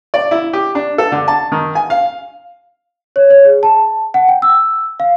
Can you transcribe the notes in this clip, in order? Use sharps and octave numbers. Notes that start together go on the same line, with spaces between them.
D5
E4
G4
D4
A4
D3
A5
D#3
G#5
F5
C#5
C#5
G#4
A5
F#5
G5
E6
F5